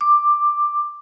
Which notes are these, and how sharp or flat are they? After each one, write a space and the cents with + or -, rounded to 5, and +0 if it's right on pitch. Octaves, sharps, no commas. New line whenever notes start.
D6 +10